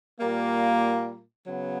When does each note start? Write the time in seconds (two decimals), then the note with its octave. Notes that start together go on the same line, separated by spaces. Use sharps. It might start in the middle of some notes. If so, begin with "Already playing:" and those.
0.21 A#2 G3 A#3
1.45 C#3 F#3 B3